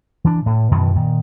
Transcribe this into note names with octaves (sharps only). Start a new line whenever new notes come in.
E3 D4
A2
F#2 B2 D#3 E3
A#2 D#3